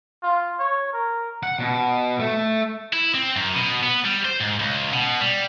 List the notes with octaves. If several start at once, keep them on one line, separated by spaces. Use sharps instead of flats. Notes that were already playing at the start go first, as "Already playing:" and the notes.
F4
C#5
A#4
F#5
B2
A3
E4
C4
F#2
B2
B3
G3
C5
G#2
C#2
B2
G3